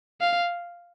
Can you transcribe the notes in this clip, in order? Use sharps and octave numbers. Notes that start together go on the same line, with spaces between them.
F5